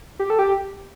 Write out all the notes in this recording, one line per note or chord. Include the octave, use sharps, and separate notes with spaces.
G4
A4
G4